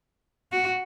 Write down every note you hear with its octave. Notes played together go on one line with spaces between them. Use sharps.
F#4